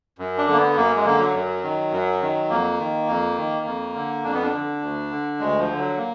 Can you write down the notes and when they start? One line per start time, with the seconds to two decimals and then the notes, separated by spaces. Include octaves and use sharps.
0.18 F#2
0.38 D4
0.47 D3
0.52 A#3
0.57 B3
0.76 F#2 A#3
0.96 G#3
1.05 D3 A#3
1.20 F#3
1.34 F#2
1.64 D#3
1.92 F#2
2.22 D#3
2.50 F2 A#3
2.79 D#3
3.08 F2
3.37 D#3
3.66 F2
3.95 D3
4.24 F2 D4
4.34 B3
4.43 D4
4.53 D3
4.82 D2
5.11 D3
5.39 D2 G#3
5.59 F3
5.70 D3
5.79 F#3
5.97 A#3